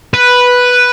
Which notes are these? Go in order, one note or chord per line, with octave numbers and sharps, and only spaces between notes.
B4